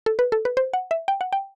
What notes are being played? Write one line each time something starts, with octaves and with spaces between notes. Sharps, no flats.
A4
B4
A4
B4
C5
F#5
E5
G5
F#5
G5